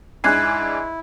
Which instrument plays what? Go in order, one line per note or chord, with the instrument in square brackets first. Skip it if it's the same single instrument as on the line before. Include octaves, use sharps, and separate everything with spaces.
[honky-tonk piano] G#2 D4 G#5 [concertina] E4 [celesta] F#6 G#6 C7